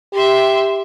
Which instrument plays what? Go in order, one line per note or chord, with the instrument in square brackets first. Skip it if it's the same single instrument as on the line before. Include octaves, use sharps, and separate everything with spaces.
[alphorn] G4 [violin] E5 C6